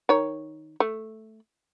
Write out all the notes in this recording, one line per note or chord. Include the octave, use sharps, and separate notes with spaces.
D#3 C#5
A3